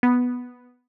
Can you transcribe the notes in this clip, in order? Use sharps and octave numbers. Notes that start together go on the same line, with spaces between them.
B3